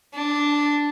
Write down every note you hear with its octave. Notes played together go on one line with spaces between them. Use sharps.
D4